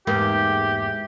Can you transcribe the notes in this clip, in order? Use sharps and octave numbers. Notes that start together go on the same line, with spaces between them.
E2 G#2 A#3 G4